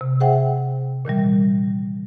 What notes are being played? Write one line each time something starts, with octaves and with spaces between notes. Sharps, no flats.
C3
G#4 C5 E5 F#5 G5
A#2 D#3 E3 G3